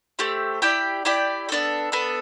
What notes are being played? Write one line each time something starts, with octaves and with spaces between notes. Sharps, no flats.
A3 C4 G4
E4 G4 D5 G5
E4 G4 D5 G5
B3 D4 A4
B3 D4 A4